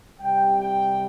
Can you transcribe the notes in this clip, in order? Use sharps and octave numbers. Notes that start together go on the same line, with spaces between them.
C2 C3 G3 G5
G5